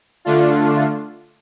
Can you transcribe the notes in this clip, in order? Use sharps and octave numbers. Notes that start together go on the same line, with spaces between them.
D3 A3 D4 F4